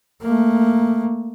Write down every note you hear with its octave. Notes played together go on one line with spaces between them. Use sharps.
A3 A#3